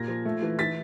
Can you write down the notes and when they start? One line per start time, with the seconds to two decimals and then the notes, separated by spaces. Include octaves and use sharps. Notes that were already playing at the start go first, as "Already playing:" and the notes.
Already playing: A#2 A#3 G#6 A#6
0.08 F3
0.25 A3
0.42 E3
0.59 E3 A6 B6